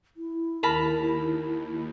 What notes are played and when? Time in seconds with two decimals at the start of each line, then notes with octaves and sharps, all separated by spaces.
0.17 E4
0.63 D#2 A#4 A5 B5